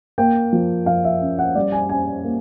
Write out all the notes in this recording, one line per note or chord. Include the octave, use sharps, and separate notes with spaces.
A#3 G5
F3
F3 F5
E5
C#4
F#5
G3 D5
G#5
C#4 G#5
A#3